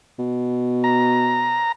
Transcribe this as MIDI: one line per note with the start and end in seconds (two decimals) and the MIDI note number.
0.19 1.65 47
0.84 1.72 82